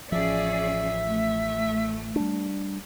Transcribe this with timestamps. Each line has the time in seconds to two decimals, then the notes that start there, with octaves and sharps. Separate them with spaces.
0.12 A1 F3 C#4 G#4 D5 E5
1.08 A3
2.16 G3 D4